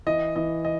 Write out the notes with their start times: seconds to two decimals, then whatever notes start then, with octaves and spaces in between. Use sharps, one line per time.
0.06 E3 D#5
0.36 E3 D#5
0.65 D#5